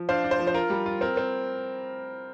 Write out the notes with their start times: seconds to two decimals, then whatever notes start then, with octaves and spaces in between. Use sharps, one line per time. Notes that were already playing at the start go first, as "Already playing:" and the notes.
Already playing: F3
0.09 D4 C5 F5
0.24 D4
0.31 C5
0.39 F3
0.47 C5
0.54 F4 A#4
0.70 G3
0.86 F4
1.01 C4 A#4
1.17 C4